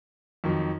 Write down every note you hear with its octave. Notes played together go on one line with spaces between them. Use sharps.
F2 D#3 F#3